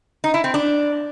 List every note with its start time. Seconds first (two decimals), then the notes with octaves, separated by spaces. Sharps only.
0.24 D#4
0.34 E4
0.44 C4
0.54 D4